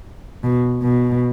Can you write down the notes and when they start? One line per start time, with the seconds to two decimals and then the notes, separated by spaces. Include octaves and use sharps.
0.43 B2
0.82 B2